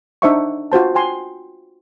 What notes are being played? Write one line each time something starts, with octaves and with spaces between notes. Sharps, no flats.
D4 D#4 C5 E5 F#5 C#6
F4 F#4 C5 A5
C5 G5 G#5 C6